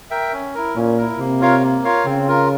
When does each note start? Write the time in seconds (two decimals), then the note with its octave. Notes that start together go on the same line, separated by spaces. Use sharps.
0.11 A#4 E5 G5
0.33 C#4
0.55 E4 A#4
0.76 A#2 C#4
0.98 E4 A#4
1.19 C3 A#3
1.41 F4 A#4 C#5 F5
1.63 A#3
1.84 F4 A#4 C#5 F5
2.05 C#3 C4
2.27 F4 A#4